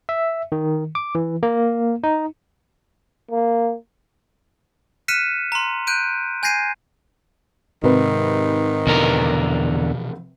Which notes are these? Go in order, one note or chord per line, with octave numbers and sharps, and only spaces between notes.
E5
D#3
D6
E3
A#3
D#4
A#3
F6 F#6 B6 C#7 D#7 E7
A#5 C6
F#6 G6 D7 D#7
G#5 G6 G#6 A#6 C7 D#7
G#2 C3 D#3 B4
E2 B2 D3 E3 F3 A#4